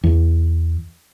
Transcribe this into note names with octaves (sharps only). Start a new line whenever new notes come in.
E2